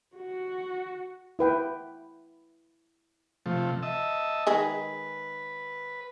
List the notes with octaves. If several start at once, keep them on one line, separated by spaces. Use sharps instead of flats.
F#4
E4 B4 G5
C3 F3 A3
D#5 E5 A5
D#3 G#3 G#4 B4